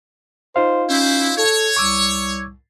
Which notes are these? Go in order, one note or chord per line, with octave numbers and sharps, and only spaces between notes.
D#4 F4 C5 F5
C#4 E4 C5
A4 C#5
C2 C#6 D6 E6